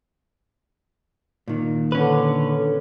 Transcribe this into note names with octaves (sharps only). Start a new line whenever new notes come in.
A#2 D#3
D3 C#4 B4